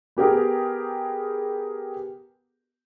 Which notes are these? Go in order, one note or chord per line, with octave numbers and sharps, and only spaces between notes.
B3 G4 G#4 A#4